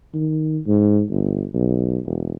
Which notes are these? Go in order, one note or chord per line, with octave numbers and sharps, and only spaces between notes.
D#3
G#2
G1
B1
E1